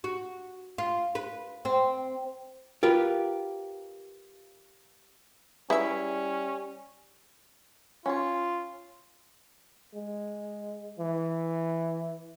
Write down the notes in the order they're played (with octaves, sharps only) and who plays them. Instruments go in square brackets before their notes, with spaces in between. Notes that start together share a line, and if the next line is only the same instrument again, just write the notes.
[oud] F#4
F4
B4
C4
[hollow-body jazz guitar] F4 G4 A#4 B4
[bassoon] G3 [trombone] C#4 [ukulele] E4 [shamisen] G#4 B4 E5
[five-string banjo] C#4 C#5 [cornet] F4
[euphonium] G#3
E3